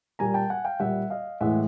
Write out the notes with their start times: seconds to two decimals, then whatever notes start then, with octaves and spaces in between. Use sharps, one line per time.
0.19 A#2 G3 G#5 A#5
0.34 G5 A5
0.50 F#5 G#5
0.65 F5 G5
0.80 A#2 G3 E5 F#5
1.10 D#5 F5
1.41 A2 E3 G#3 E5 F#5